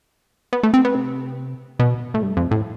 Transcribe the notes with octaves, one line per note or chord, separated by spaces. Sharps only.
B3
A3
C4
B3
C3
B2
A2
G2
F2
A2